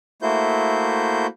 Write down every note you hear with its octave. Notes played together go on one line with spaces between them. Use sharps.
A3 A#3 E4 F#4 C5 G6